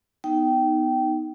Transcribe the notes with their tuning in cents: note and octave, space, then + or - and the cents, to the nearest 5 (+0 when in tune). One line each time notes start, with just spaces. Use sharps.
B3 +0 D#4 +0 G5 -20